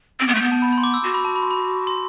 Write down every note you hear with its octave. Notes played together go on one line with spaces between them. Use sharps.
C4 D7
B3
A3
B3 G6
A5
B5
B5
C6
D6
E6
F#4 D6
B5
A5
B5
C6
B5
C6